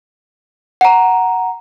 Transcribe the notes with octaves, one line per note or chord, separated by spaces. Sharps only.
F#5 A#5